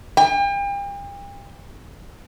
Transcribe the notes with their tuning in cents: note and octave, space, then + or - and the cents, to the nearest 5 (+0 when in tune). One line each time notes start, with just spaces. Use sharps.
G5 +40